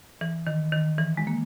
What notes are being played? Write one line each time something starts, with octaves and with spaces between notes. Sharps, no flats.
E3
D#3
D#3
E3
G#3
A#3